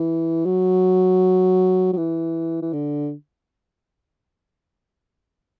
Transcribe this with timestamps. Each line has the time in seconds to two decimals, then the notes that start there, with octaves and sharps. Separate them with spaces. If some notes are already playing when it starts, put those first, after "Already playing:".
Already playing: E3
0.46 F#3
1.93 F#3
1.97 E3
2.62 E3
2.73 D3